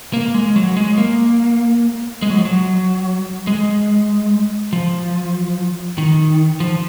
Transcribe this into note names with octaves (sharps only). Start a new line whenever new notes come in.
A#3
G#3
F#3
G#3
A#3
G#3
F#3
F3
F#3
G#3
F3
D#3
F3